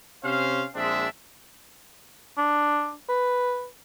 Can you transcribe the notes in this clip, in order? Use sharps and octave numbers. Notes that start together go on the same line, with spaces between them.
C3 C#4 C5 F5
A#1 G#3 C4 D4 E5
D4
B4